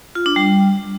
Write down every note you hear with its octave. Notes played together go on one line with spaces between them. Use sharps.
F4
D4
G3